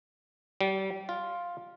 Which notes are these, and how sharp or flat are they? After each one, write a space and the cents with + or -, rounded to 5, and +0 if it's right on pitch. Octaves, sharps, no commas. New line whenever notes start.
G3 -30
F4 +5